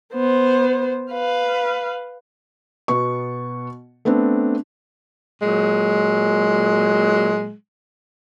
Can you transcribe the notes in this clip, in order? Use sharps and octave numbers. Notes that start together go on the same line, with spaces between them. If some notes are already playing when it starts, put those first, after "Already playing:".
B3 C5
B4 F5
B2 B3 C#6
A3 B3 C4 D4
A#2 F#3 G#3